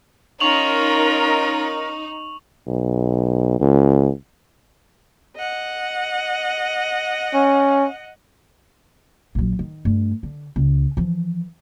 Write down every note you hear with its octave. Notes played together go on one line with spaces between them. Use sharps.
C#4 D#4 F4 A#4 A#5 C#6 F7 F#7
B1
C#2
D#5 F#5
C#4
A#1 F#3
D#3
G2 A3
D3
C#2
E3 F3